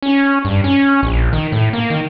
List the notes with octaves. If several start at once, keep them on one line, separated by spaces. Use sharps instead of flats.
C#4
G2
C#4
A#1
D#3
A2
A#3
D#3